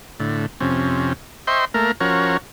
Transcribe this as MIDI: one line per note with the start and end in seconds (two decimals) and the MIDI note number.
0.20 0.46 45
0.20 0.46 50
0.60 1.13 41
0.60 1.13 48
0.60 1.13 61
1.47 1.65 72
1.47 1.65 75
1.47 1.65 76
1.47 1.65 79
1.47 1.65 84
1.47 1.65 85
1.74 1.92 57
1.74 1.92 58
1.74 1.92 70
2.00 2.37 53
2.00 2.37 61
2.00 2.37 66
2.00 2.37 70
2.00 2.37 73